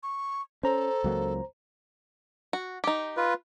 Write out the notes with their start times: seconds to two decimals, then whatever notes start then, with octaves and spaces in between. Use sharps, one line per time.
0.03 C#6
0.63 C#4 A4 C5 A#5
1.04 C#2 F#3 A#3
2.53 F#4
2.84 D#4 G4
3.17 F4 B4